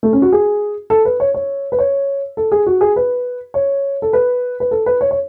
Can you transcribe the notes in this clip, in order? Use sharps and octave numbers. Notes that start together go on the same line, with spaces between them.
A3
C#4
F#4
G#4
A4
B4
C#5
C#5
B4
C#5
A4
G#4
F#4
G#4
B4
C#5
A4
B4
B4
A4
B4
C#5
C#5